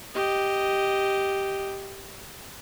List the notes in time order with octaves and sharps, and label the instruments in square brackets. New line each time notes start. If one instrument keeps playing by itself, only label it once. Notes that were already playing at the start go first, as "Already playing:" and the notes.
[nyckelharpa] G4 D#5